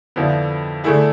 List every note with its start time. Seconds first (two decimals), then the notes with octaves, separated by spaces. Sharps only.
0.16 F2 D3 F3 B3 E4
0.84 D3 A3 E4 G#4